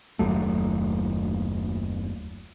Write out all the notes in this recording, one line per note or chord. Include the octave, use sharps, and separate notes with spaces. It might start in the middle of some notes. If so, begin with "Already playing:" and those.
F#1 D#2 F#3 A3